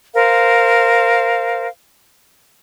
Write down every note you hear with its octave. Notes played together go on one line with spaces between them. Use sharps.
A#4 C5 F5